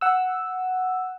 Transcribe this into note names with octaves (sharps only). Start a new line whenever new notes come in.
F#5 E6